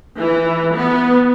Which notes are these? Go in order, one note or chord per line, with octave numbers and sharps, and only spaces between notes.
E3
B3